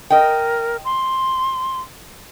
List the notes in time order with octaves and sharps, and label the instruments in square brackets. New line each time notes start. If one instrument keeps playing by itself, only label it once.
[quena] A#4 [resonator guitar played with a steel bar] D#5 G5
[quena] C6